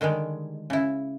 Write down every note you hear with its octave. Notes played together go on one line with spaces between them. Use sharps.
D3 D#3 G3 G#3
C#3 E4